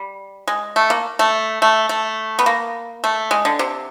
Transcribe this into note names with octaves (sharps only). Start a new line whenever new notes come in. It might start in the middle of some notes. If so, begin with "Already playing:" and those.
Already playing: G3
G#3
A3
A#3
A3
A3
A3
B3
A#3
A3
G#3
D3
C3